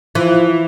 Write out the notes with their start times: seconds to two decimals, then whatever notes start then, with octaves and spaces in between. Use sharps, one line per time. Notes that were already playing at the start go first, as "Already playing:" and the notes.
0.15 E3 F3